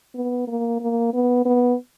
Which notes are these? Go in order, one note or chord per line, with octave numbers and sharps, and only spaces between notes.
B3
A#3
A#3
B3
B3